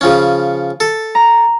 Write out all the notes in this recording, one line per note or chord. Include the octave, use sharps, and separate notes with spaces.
C#3 F3 C#4
A4
A#5